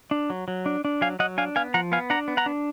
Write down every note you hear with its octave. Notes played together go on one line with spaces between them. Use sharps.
D4
F#3
F#3
D4
D4
F#3 F5 G#5
F#3 D#5 F#5
D4 F5 G#5
B3 F5 G#5
F3 F#5 A#5
B3 F5 G#5
D4 F#5 A#5
B3
F#5 A#5
D4